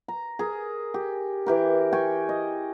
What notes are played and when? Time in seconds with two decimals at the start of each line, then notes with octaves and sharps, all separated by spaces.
0.08 A#5
0.39 G#4 A#4
0.94 G4
1.46 E3 G4 A#4
1.92 G5 G#5 C#6
2.29 D#5